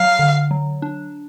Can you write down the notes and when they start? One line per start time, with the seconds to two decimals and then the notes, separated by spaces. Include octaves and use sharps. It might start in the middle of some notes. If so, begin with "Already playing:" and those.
Already playing: F#3 F5
0.19 D3
0.51 F#3
0.82 D4